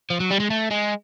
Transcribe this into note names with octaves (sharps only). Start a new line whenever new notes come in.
F3
F#3
G3
G#3
A3
G#3